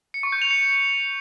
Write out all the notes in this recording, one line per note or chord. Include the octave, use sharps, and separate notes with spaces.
C#7
C#6
G6
F7
C#7